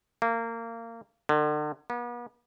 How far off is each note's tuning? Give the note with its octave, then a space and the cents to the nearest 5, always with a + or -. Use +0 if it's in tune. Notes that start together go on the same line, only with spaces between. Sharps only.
A#3 -25
D3 +40
B3 -40